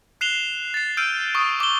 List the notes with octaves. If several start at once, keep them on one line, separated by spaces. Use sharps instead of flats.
F#6 C7 E7 F7 G7
A6 C7
E6 F6 G6 D7 D#7
C#6 D#6 C7
D6 G7